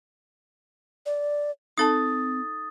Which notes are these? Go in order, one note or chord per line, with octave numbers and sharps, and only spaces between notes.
D5
C4 D#4 A4 A5 D#6 A6